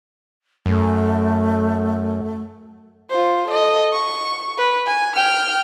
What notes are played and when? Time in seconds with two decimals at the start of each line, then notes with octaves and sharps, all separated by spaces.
0.66 F#2 A3
3.10 F4 C5
3.48 A4 D#5
3.93 C#6
4.57 B4
4.86 G#5
5.16 G5 F6